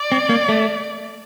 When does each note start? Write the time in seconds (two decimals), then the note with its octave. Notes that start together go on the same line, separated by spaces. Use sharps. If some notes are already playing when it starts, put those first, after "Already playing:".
Already playing: D5
0.12 C4
0.29 A#3
0.49 A3